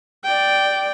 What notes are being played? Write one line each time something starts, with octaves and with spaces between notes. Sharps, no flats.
D5 G5